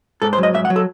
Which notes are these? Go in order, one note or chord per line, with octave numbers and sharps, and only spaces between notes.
G#2 A4
C5
F#3
D#5
G#2 E5
F#5
F#3
A4